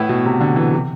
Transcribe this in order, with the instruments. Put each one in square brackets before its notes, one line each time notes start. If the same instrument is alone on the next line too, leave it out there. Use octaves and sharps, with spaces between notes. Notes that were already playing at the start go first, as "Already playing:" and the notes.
Already playing: [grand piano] A2 [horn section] E3 B3 E4
[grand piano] B2
C3
D3
E3
C3